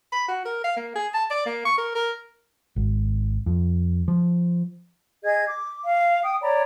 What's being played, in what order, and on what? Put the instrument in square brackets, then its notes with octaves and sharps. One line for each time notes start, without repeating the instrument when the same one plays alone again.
[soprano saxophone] B5
F#4
A#4
F5
A#3
G#4
A5
D5
A#3
C#6
A#4
A#4
[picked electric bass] G#1
F2
F3
[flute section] G#4 D#5 G#6
D6
F5
G5 D#6
C#5 D5 A#5 B5